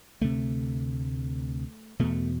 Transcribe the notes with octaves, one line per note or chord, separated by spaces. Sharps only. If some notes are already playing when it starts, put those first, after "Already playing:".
D2 C3 A3
E2 B2 A3